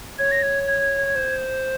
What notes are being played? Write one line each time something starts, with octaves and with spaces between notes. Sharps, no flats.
C#5 G#6
A#6
G#6
G#6
C5